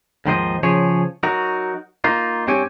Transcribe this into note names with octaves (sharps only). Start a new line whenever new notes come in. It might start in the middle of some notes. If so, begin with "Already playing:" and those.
D#2 G#2 D#3 F3 C5 D#5
C#3 F3 G#4 C#5
F#3 D#4 F#4 A#4
A#3 D#4 F4
G2 C4 G4 C#5 G#5